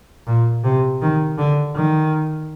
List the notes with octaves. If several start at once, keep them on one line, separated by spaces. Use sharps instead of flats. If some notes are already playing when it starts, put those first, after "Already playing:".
A#2
C3
D#3
D3
D#3